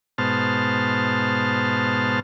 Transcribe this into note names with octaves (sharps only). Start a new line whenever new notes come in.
G#2 B2 C5 A5 F6